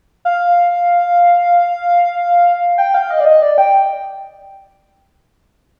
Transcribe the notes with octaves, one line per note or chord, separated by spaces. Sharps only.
F5
G5
F5
D#5
D5
D#5
D5
G5